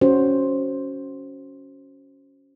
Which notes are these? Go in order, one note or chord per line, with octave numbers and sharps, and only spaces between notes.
C#4 F#4 C5